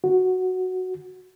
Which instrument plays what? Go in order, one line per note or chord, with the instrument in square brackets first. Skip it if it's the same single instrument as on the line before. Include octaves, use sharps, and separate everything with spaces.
[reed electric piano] F#4